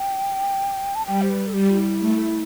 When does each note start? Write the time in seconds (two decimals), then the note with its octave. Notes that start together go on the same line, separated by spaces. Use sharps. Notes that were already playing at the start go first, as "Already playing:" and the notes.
Already playing: G5
0.95 A5
1.06 G3 G5
1.22 C5
1.30 B4
1.47 A4
1.53 G3 G4
1.69 F4
1.76 E4
2.00 A3